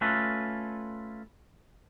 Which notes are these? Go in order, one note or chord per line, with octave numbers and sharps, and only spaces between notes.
A3 C#4 F4 A4 B4